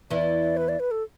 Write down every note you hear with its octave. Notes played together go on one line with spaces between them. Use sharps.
E2 E3 D5
B4
D5
B4
A4